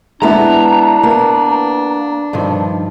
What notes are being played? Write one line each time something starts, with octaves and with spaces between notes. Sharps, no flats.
G#3 B3 D4 E4 A#5
A#3 B3
G2 D#3 F3